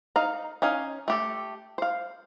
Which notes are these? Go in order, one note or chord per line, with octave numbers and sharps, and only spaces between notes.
D#4 F5 A#5
C#4 D#4 F5 G#5
A3 G4 A4
C5 F5